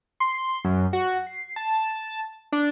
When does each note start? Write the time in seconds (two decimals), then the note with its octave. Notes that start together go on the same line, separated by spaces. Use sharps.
0.20 C6
0.45 C6
0.64 F#2
0.93 F#4
1.27 C7
1.56 A5
2.52 D4